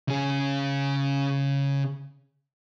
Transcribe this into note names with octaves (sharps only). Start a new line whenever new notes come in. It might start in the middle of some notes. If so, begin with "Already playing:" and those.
C#3 G#4